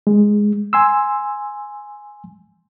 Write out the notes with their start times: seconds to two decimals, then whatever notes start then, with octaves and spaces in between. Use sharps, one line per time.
0.07 G#3
0.73 G#5 C6 E6